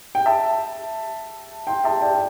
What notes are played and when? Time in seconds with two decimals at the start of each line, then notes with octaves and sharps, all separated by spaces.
0.15 G5
0.26 E5 A5
1.67 G5 C6
1.84 E5 A5
2.01 D5 G5